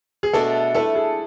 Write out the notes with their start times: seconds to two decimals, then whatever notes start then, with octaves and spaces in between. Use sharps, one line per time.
0.23 G#4
0.33 B2 A3 D4 A4
0.75 A3 E4 A4 B4
0.95 G#4